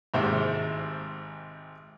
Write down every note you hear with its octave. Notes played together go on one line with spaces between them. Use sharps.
G#1 G#2 C3 C5